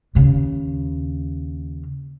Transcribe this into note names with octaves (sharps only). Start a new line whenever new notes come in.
D#2 C#3